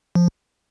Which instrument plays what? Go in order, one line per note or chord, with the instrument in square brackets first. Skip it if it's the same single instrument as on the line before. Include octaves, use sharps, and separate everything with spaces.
[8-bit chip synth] F3